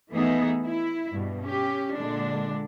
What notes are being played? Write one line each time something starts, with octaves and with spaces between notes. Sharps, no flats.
E3 A3 B3 D#4 G#4 E5
E4
G2 B2
C#4 G4
A#2 D3 G#3 D4